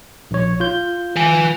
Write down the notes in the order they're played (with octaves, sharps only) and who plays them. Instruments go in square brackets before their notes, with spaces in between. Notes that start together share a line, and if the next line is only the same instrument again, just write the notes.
[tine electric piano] A#1 C#5
F4 G6
[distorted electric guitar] B4 G#5